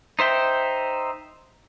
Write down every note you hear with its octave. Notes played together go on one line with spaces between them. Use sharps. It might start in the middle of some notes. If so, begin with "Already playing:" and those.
D#4 C5 E5 G5